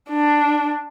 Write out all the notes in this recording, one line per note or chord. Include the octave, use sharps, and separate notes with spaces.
D4